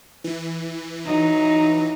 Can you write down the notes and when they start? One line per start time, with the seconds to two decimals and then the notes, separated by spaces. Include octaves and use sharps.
0.24 E3
1.05 F#3 D#4